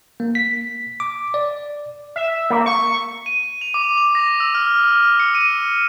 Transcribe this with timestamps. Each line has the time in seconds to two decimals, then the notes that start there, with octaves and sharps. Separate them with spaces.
0.20 A#3
0.35 B6
1.00 D6
1.34 D5
2.16 E5
2.50 A#3
2.66 C#6
3.26 D#7
3.61 F7
3.74 D6
3.97 F7
4.15 A#6
4.40 E6
4.55 F6
4.84 F6
5.20 C#7
5.35 D#7